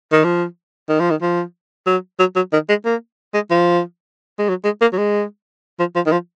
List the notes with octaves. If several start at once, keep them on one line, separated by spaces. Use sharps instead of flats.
D#3
F3
D#3
F3
D#3
F3
F#3
F#3
F#3
D#3
G#3
A#3
G#3
F3
G#3
F#3
G#3
A#3
F#3
G#3
F3
F3
D#3
F3